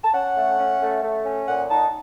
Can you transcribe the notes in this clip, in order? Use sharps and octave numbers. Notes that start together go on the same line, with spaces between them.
A5
C#4 F#5
A3
C#4
A3
A3
C#4
A#2 F#5
D#4 A5